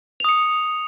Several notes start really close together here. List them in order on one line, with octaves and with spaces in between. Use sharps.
F7 D#6 C#7